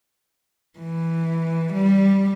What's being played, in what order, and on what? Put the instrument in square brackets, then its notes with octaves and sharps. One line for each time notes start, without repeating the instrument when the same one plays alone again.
[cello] E3
G3